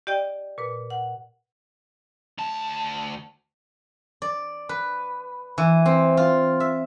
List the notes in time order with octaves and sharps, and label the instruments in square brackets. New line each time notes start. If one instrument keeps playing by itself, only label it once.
[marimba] G4 D5 D#5 G5
A#2 B4
F#5
[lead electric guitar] D2 A5
[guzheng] D5
B4
E3
C4
F4
E5